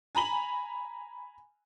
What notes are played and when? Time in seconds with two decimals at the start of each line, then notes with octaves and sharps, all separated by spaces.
0.15 G#5 A#5 B5 F#7